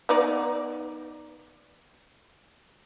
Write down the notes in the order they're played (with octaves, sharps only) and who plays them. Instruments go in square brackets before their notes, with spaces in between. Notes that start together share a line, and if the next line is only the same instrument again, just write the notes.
[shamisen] B3 D#4 D5